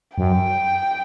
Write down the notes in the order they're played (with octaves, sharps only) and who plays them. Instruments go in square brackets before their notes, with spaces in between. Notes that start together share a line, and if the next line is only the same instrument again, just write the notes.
[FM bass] F#2 [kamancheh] G5